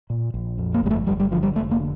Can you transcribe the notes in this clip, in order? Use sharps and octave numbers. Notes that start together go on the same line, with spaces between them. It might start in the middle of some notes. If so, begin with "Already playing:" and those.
A#2
A#1
F2
A#3
G1 G3
A3
G1 G3
G3
D3 F3
G3
F1 A3
A#3
D3